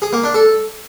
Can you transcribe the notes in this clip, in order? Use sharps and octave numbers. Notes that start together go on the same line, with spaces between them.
G#4
A#3
D4
A4